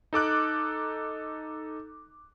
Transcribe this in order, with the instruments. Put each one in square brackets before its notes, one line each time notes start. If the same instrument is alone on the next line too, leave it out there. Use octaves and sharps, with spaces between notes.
[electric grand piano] D#4 A4 D6 F#6